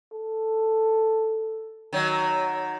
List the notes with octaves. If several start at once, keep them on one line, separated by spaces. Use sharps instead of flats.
A4
D#3 F#3